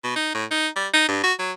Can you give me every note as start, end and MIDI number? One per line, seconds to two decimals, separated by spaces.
0.04 0.16 47
0.16 0.31 63
0.35 0.45 45
0.51 0.68 63
0.76 0.88 55
0.94 1.05 63
1.08 1.20 43
1.24 1.33 66
1.39 1.52 54